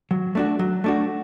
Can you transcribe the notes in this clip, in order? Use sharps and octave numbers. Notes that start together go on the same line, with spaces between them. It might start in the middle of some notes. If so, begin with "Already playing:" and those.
F#3
A3 D4 F#4
F#3
A3 D4 F#4